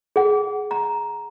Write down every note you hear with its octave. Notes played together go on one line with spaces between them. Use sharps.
G#4 F#5
A#5